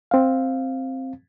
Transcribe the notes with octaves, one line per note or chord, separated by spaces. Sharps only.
C4 F5